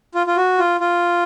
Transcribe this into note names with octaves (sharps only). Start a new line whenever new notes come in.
F4
F4
F#4
F4
F4